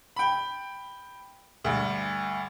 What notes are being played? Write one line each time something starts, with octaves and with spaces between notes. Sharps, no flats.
G5 B5
D2 G2